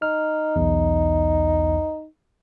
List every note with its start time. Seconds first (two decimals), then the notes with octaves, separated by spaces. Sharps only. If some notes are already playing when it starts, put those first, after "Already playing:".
0.02 D#4 F6
0.56 B1 E2